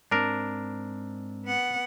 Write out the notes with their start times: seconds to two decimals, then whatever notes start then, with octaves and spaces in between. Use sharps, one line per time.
0.11 G#2 C4 D4 A#4
1.46 B3 F#5